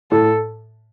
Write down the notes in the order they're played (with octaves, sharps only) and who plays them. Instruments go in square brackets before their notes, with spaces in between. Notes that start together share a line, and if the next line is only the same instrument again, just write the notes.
[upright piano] A2 [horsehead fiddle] A4